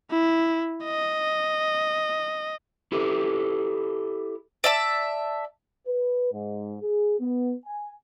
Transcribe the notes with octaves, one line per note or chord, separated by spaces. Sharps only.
E4
D#5
E4 G4 A4
D5 E5 A5
B4
G#2
G#4
B3
G#5